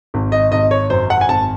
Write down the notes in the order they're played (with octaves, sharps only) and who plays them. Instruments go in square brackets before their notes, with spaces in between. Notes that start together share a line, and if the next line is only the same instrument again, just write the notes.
[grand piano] G#1
D#5
G#1 D#5
C#5
F#2 C5
F#5
G#5
G#1 A5